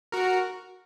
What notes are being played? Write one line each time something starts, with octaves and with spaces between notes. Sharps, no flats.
F#4 A#4